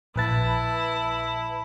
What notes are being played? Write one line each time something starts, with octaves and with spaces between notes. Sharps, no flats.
A#1 E4 B4 A5